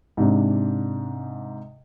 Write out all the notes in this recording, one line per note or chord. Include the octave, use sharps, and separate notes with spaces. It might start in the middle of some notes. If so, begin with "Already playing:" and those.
G#2 C3 D4